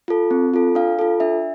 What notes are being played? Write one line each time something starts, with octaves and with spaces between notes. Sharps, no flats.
F4 A4
C4
F4 A4
D4 F5
F4 A4
D4 E5